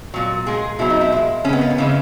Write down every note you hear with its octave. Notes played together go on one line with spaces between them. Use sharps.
A#2 F#3
A#2 G#3 G#4
B2 F#3 E4
D#4
E4
A#2 G#3
C#3 G#3 B3 C#4
A#3
B3
C#3 E3 G#3 C#4